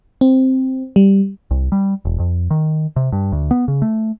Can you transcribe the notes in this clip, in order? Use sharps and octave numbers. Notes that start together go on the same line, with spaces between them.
C4
G3
C2
G3
E1
F2
D#3
C3
G2
D2
B3
C#3
A3